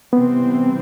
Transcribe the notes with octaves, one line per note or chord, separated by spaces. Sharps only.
C3 E3 G3 B3 C4